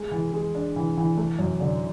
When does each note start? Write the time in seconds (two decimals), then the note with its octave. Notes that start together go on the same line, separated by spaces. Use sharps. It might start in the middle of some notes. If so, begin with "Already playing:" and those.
Already playing: G#3
0.11 E3
0.33 G#3
0.55 D4
0.76 E3
0.97 E3
1.18 A3
1.39 F#2
1.60 D3